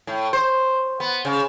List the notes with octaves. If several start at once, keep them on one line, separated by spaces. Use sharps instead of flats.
A2
C5
B3
C#3